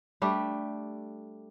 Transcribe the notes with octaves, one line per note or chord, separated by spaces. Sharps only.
G3 A3 D4 G4